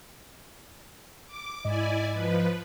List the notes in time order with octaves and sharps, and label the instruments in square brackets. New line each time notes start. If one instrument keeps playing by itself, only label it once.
[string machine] D6
[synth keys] G#2 D#5 [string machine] E4 D5 G#5
[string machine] F3 B4